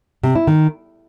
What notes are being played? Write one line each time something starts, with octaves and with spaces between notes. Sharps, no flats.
C3
E4
D#3